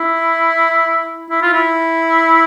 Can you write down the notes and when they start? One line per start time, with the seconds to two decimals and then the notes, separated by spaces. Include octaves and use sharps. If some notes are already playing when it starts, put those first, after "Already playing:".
Already playing: E4
1.30 E4
1.42 F4
1.53 E4